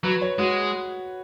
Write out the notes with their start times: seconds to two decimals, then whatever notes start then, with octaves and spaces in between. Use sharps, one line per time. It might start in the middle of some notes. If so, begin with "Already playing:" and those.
0.04 F#3 B4
0.22 C#5
0.39 G#3 F#4